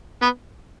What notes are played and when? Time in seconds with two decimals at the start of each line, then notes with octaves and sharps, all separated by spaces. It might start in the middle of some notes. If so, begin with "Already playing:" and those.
0.22 B3